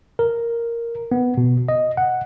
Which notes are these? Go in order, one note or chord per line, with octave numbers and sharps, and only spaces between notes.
A#4
B3
B2
D#5
F#5